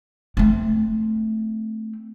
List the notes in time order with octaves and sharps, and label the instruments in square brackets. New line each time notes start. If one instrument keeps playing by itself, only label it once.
[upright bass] A3 C4